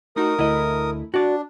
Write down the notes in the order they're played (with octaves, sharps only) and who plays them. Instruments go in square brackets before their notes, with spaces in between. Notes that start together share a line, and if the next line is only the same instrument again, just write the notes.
[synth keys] A3 D#4 F#4 [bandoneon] A#4 D#6
[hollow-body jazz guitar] D2 D#5 [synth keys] A3 E4
[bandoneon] D4 [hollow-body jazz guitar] F#4 D5